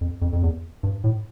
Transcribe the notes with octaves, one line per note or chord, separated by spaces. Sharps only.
F2
F2
F2
E2
G2
A2